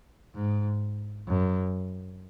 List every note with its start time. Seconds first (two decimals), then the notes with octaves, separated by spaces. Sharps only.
0.35 G#2
1.28 F#2